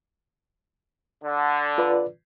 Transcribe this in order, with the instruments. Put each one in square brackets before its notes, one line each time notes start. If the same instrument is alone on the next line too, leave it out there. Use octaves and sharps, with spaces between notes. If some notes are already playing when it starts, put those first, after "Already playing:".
[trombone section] D3
[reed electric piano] F4 B4 D5